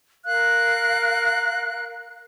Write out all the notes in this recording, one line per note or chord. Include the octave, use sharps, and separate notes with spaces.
A#4 F5 F#6